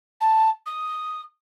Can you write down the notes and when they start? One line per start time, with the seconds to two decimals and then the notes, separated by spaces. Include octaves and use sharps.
0.21 A5
0.66 D#6